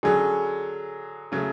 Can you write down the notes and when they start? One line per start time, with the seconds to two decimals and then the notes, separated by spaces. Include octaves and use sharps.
0.03 D3 F#3 C#4 G#4
1.32 C#3 F#3 A3